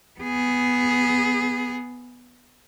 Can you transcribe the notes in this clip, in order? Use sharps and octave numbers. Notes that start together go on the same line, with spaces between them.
B3 G#4